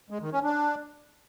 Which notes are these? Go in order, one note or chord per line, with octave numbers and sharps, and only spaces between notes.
G#3
D#3
C#4
D4